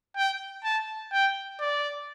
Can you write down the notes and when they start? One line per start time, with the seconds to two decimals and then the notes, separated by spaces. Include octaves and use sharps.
0.17 G5
0.64 A5
1.12 G5
1.60 D5